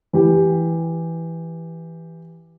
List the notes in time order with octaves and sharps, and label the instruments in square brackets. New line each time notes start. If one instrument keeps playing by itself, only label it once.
[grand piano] E3 G4